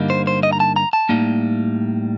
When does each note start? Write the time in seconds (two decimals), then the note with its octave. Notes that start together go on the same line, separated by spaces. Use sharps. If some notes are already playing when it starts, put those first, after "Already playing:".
Already playing: G2 D3 G3 A#3 D#4
0.10 C5
0.27 C5
0.43 D#5
0.53 A#5
0.60 A5
0.76 A#5
0.93 A5
1.09 A2 G3 A#3 D#4